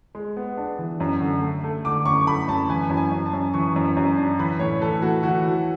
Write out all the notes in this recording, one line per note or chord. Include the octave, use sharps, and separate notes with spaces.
G#3
B3
D4
E3
F#2
D3
A3
A3
D3 D6
F#2 C#6
A3 B5
F#2 A5
E3 G#5
F#2
G#5
F#2
A5
F#2
E3 C#6
F#2
F#2
D4
E3 B5
A2 C#5
E3 A4
A3 F#4
E3 F#4
A3